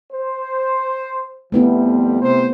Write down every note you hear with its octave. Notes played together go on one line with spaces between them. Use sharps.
C5
F2 F3 G3 A3 B3 E4
C3 C5